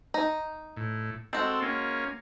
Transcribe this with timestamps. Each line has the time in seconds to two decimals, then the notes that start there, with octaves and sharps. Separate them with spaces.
0.14 D#4
0.77 A2
1.33 G#3 C4 F#4 A4 G5
1.62 A#3 C#4